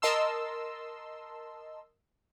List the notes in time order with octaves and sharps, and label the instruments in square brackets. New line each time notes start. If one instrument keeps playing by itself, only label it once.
[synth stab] A#4 D#5 A5 C6 E6